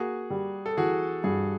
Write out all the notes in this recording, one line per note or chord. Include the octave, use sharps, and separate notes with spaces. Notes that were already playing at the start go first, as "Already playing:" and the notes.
Already playing: A#3 F#4 G#4
G3
A4
E3 F#4 G#4
G2 F#4 G#4